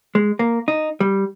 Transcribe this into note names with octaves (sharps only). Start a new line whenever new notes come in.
G#3
A#3
D#4
G3